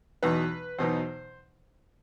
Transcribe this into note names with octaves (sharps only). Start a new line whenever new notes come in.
E2 B2 F#3 B3 D#4 B4
E2 B2 F#3 B3 D#4 C5